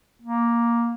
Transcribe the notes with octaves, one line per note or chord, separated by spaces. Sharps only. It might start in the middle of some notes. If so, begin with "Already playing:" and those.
A#3